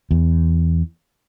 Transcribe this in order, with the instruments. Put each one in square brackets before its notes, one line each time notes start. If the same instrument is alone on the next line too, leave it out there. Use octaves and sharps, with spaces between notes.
[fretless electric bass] E2